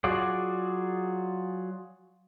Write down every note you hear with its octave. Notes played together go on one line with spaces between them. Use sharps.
F#3 F4 F#4 G#4 D5